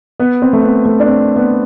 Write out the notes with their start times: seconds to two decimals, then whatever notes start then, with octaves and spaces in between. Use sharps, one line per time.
0.20 B3
0.42 C4
0.53 A3
0.63 B3
0.86 A3
1.00 D4
1.06 C4
1.36 B3